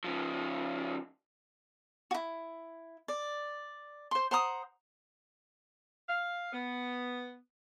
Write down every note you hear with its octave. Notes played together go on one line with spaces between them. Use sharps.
C#3 F3
E4 F#4
D5
C5 C6
C5 F#5 A#5 D#6
F5
B3